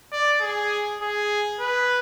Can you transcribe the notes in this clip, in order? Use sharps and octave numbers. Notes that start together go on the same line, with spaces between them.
D5
G#4
G#4
B4